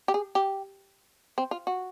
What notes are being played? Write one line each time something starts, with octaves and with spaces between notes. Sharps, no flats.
G4
G#4
G4
C4
F4
F#4